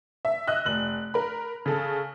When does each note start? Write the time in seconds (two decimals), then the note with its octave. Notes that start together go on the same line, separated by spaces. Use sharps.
0.25 E5
0.47 D#5 E6 F#6
0.65 F1 F#7
1.14 A#4 B5
1.66 C#3 A4